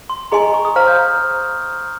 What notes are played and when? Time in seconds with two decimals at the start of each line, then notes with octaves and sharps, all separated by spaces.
0.10 C6
0.32 G#4 D#5 G#5 A#5 C6
0.43 A#5
0.54 C#6
0.65 D#6
0.76 C5 F5 A#5 F6
0.87 G6